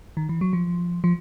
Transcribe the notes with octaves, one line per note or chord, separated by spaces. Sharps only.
D#3
E3
F#3
F3
F3